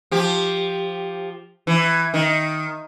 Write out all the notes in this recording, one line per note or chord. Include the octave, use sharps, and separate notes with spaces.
F3 G4
E3
D#3